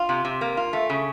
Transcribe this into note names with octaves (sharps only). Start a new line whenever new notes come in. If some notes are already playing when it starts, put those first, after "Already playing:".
Already playing: F4
C3
C3
A#3
F4
A3
C#3